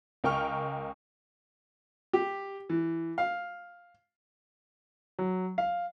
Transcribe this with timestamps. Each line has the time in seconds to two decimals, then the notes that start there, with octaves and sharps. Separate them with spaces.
0.24 C#2 A#4 G5 C#6 F6
2.13 G4
2.70 E3
3.18 F5
5.19 F#3
5.58 F5